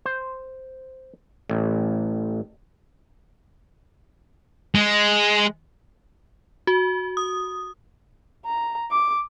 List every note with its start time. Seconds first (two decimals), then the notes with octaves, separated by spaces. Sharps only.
0.06 C5
1.49 A1
4.75 G#3
6.67 F#4
7.17 D#6
8.46 A#5
8.91 D6